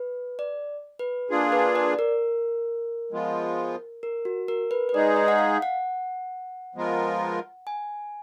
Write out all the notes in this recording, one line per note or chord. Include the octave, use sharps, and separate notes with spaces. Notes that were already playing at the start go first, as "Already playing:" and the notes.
Already playing: B4
D5
B4
A#3 D4 F4 G#4
B4
D5
A#4
F3 G#3 B3 F4
A#4
F#4
A#4
B4
B4
G#3 D#4 G#4 D5
D#5
F#5
F5
F#5
F3 G#3 B3 F4 A#4
G#5